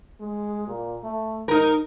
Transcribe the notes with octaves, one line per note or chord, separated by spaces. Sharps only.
G#3
A#2
A3
G#2 D#4 A#4